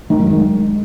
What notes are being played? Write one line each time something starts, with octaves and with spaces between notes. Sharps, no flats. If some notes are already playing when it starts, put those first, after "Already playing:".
D#3
F#2
G#3